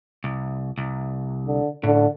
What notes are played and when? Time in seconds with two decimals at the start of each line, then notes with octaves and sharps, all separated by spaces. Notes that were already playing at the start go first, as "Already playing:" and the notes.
0.24 C2
0.78 C2
1.46 D3
1.84 A2 D3